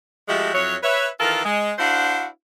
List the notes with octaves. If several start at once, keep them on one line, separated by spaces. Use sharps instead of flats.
F3 G#3 A3 F#4 G4 E5
F2 F#3 E4 C#5
B4 C#5 E5
D#3 E3 F4 A4 A#4
G#3
D4 E4 F#4 C5 F5 F#5